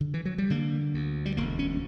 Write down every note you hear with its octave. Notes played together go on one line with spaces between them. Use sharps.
D3
E3
F#3
G3
D3 A#3
D2
G3
E1 A#3
C#4